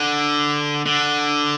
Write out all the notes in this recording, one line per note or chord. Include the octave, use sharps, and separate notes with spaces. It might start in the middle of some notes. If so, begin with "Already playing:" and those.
Already playing: D3
D3